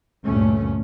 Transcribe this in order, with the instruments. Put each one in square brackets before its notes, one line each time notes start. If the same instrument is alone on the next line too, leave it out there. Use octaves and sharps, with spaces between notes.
[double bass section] D2 G2 A#2 A3 C#4